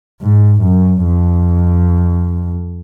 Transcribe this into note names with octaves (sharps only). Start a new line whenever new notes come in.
G#2
F#2
F2